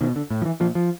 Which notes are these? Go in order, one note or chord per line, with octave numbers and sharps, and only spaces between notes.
B2 D#3
D3
A2
F3
E3
A#2 F3
F3